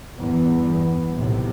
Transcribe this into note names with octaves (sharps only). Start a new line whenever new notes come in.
E2 G2 B3
B1 A2 C3